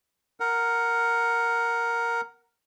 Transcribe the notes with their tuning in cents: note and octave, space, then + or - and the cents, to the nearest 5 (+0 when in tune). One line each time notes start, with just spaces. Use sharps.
A#4 +0 F#5 +0